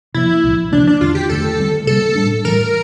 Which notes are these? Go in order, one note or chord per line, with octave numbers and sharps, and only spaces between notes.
C3 F3 A#3 E4
C2 A#2 F3
C3 F3 A#3 D4
D4
E2 D3 A3 D4 F4
G4
E2 D3 A3 A4
D2 D3 G3 C4
C3 G3 A#3 A4
A2 G3 D4
A2 E3 G3 A#4